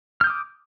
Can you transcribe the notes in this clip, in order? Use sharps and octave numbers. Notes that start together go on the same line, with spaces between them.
D6 D#6 F6 G6